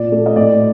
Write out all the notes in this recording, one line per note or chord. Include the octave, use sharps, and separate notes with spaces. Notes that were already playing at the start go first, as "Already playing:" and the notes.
Already playing: A#2 D5
A3
D#5
A2 D5